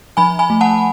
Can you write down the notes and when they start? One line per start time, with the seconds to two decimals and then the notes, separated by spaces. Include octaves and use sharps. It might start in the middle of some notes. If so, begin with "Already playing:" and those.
0.17 F3 G#5 B5
0.39 G#5 B5
0.50 A3
0.61 F#5 A5